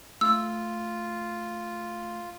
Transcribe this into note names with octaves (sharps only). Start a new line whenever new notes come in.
A3 F4 E6